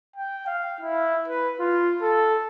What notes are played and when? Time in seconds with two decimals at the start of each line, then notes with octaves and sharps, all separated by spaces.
0.16 G5
0.47 F5
0.81 E4
1.28 B4
1.60 F4
2.02 A4